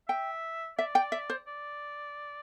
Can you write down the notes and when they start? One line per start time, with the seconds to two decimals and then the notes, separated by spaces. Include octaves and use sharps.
0.08 E5 G5
0.78 D5 E5
0.95 G5
1.12 E5
1.30 C5
1.47 D5